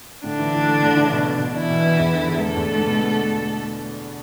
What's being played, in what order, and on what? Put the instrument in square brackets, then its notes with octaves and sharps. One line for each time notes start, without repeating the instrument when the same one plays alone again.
[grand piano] A2 [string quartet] D3 D4
[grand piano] E3
E4
A3
A2
E3
B2
B3
B2
[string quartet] E3 E4 [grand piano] D4
[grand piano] B2
B3
E2
D3
E2
[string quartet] A3 A4 [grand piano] B3
[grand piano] E2
D3
B2
B3